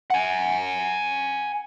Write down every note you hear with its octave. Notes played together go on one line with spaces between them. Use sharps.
F#5 G#5